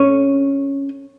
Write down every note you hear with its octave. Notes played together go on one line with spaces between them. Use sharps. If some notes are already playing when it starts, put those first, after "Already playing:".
Already playing: C#4